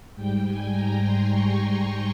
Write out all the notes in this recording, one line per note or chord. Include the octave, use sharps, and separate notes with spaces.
G#2 G3 G5
G#5
A#5
C6
C#6